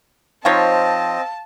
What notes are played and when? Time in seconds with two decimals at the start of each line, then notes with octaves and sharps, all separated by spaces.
0.45 F3 C4 D#4 C#5 D#5 F5 A5